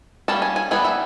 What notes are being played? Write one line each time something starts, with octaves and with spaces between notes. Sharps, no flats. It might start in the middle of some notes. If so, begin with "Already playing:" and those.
G3 A#3 C#4 A5
G#5
G#5
E3 G3 B3 G#5
E5